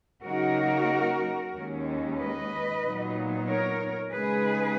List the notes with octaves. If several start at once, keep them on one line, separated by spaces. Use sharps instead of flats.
C#3 F#3 A#3 D#4 F#4 A#4
D#2 D#3 G#3 C#4
B4 D#5
A#2 F#3 B3 D#4
A#4 C#5
C#3 G#3 D#4 G#4 B4